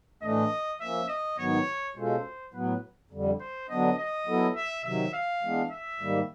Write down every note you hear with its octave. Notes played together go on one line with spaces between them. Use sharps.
A2 E3 A3 D4 D#5
F3 A#3 C#4 E5
D#5
G#2 D#3 F#3 B3 C#5
B2 G#3 C#4 F4 A4 C5
A2 F#3 B3 B4
F2 D3 G3
C5
D3 F#3 B3 D4 D#5
D#5
F#3 B3 E4 A4
E5
C3 D#3 F#3 E5
F5
E3 G#3 B3 D4
E5
G#2 D#3 G3 A#3